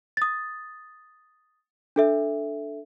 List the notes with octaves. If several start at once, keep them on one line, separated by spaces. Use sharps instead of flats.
D#6 A6
D4 A4 E5